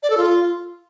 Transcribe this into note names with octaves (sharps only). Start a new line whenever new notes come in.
D5
A4
F4